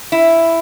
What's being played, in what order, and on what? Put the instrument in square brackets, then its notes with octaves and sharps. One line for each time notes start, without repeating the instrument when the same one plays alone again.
[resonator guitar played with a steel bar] E4